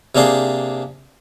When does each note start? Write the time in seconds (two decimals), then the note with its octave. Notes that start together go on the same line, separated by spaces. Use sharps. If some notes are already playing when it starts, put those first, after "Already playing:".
0.15 C3 A#3 C4 D4 G#4 C6